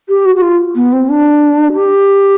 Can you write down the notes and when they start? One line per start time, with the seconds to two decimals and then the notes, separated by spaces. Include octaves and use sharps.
0.09 G4
0.26 F#4
0.36 F#4
0.42 F4
0.75 B3
0.93 C4
1.09 D4
1.74 G4